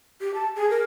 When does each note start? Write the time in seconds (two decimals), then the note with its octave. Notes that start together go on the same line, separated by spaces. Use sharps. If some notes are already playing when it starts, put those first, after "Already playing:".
0.21 G4
0.34 A5
0.56 G#4
0.70 A#4